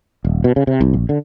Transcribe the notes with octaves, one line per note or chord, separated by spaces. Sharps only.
D#1
B2
C#3
C3
C2
A#1
D3